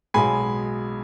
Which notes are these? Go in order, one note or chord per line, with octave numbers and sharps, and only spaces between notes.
B1 B2 G#3 G#5 B5